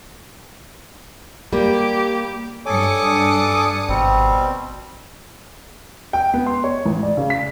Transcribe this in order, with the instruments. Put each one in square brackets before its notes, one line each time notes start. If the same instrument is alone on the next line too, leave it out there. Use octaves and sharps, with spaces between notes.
[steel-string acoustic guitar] G3 A#3 [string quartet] G4
[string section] G2 D#6 C#7 [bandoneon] A4 G#5 D6 [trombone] C#5
[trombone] D4
[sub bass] G#1 [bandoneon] B2 G3 C4
[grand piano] G5
B3
C6
C#5
A1
D5
C#3
B6